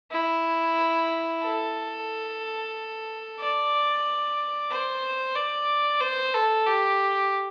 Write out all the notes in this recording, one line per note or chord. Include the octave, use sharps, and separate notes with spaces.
E4
A4
D5
C5
D5
C5
A4
G4